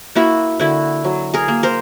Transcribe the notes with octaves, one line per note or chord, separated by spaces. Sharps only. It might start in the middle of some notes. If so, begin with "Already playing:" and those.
A#3 E4 F#4
D3 E4 F#4
F#3
G#4 A#4
A#3
A#4 C5